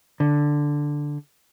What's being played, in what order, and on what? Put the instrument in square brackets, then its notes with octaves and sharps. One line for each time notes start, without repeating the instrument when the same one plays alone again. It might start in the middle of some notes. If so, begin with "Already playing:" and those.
[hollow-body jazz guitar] D3